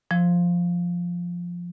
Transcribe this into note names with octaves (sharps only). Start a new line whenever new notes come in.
F3